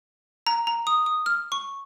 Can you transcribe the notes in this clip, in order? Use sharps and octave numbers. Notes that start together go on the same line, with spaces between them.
A#5
A#5
D#6
D#6
F6
C#6